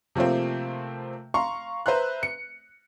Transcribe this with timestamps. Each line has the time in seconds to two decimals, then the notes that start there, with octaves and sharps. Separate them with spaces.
0.15 C3 F3 A3 A#3 C4
1.34 F5 A#5 C6 C#6
1.86 B4 C5 E5 A#5 C6 F#6
2.23 C#7